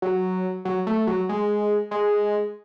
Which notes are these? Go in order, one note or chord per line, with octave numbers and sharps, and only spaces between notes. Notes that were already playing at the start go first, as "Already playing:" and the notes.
F#3
F#3
A3
F#3
G#3
G#3